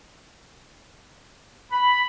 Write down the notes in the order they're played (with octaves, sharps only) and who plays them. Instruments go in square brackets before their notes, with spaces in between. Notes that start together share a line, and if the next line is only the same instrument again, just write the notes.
[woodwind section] B5